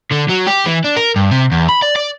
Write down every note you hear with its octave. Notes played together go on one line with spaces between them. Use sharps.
D3
F#3
G4
E3
D4
A#4
G2
C3
E2
B5
D5
D5